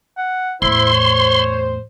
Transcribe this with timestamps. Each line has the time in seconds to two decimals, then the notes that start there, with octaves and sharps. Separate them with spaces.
0.18 F#5
0.62 E2 A2 E4 C5 C6
0.93 C#5